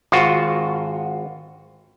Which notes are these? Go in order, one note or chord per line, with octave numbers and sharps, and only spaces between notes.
G#1 F4 F#4